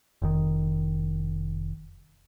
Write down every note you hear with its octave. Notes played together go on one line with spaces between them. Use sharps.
F1 D#3